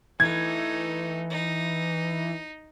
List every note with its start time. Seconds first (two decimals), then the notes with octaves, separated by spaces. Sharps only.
0.20 E3 A3 D#4 G#6
1.30 D#4